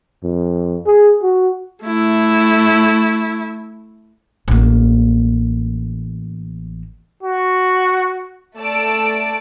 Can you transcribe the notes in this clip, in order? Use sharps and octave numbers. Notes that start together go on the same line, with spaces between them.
F2
G#4
F#4
A3 E4
A1 A#3
F#4
A3 D5 A5 E6 D7